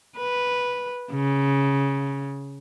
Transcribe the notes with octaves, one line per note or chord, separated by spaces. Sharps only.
B4
C#3